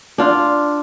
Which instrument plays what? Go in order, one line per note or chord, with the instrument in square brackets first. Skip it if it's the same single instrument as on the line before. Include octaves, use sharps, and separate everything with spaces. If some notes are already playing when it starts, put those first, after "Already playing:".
[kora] D4 F4